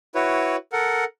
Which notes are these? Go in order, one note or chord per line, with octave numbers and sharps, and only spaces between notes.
E4 F#4 B4 C#5
A4 A#4 F#5